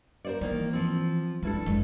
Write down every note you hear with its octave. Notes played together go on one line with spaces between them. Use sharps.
A#4 C5 D5
D#3 E3 A#3 D#4
F3 C4
G2 G#3 E4 A4
F#1 G#3